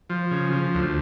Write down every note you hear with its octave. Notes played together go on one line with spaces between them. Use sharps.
F3
C#3
F3
D2